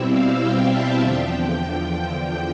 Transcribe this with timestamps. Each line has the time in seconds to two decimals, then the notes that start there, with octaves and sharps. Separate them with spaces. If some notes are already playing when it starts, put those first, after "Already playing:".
Already playing: B2 G3 C4 E4 E5
0.09 F5
0.39 G5
0.71 A5
1.02 E2 D3 F3 G5